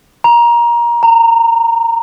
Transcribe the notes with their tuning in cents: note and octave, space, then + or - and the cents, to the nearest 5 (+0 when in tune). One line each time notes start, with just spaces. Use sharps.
A#5 +20
A#5 -25